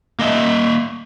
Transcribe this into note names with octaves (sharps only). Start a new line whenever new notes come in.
A#3 D#5 E5